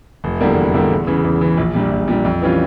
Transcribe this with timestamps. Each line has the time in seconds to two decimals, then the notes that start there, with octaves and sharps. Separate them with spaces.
0.24 F1
0.41 E2 D3 G3 A#3
0.57 F1
0.74 E2 D3 G3 A#3
0.90 E2
1.07 C#3 E3
1.24 E2
1.41 C#3 E3
1.57 A#1
1.74 A#2 G3 D4
1.91 A#1
2.08 A#2 G3 D4
2.25 F2
2.42 E3 G3 C#4 F4